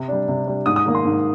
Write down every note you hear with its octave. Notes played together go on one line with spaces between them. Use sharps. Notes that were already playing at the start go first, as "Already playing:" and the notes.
Already playing: C3
G3 D4
C3
G3 D4
G#2 D#6
D#6
D#3 A#3
C6
G#2